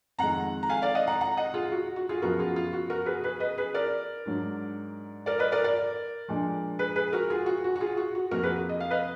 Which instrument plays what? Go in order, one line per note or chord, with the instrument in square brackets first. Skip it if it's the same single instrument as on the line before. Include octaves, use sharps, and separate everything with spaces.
[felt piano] F2 D#3 G#3 F#5 A#5
A#5
F5 G#5
D5 F5
D#5 F#5
F#5 A#5
F#5 A#5
D#5 F#5
F4 G#4
F#4
F#4
F4 G#4
F#2 F3 B3 F#4 A#4
F4 G#4
F4
F#4
F#4 A#4
G#4 B4
G#4 B4
B4 D#5
G#4 B4
A#4 D5
G#2 F#3 D4
A#4 D5
B4 D#5
A#4 D5
A#4 D5
A#2 F3 G#3 D4
G#4 B4
G#4 B4
F#4 A#4
F4 G#4
F#4
F#4
F#4
F4 G#4
F#4
F#4
F2 F3 A#3 F#4 A#4
G#4 B4
D#5
F5
B4 D#5